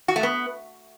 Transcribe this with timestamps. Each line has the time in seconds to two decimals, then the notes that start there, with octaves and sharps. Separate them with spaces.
0.08 F#4
0.16 A3
0.23 B3